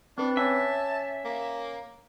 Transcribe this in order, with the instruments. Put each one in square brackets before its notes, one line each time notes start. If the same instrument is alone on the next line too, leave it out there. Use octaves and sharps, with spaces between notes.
[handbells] C4 B4 [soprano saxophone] D4
[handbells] C#4 C#5 [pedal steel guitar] E5 [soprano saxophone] A5
[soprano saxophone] A#3